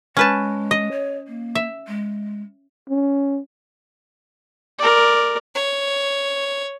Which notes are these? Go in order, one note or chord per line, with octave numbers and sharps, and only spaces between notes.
G#3 C#4 B4 A5
D#5
C#5
A#3
E5
G#3
C#4
A#4 D5
C#5